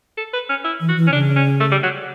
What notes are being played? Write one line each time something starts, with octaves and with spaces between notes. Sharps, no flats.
A4
B4
C#4
E4
E3
F#4
E3
C#4
C#3 D4
C#4
A3
G3
F#3